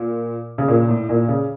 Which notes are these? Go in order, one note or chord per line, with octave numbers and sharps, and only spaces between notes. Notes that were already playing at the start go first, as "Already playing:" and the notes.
Already playing: A#2
C#3
A#2
A2
A#2
C#3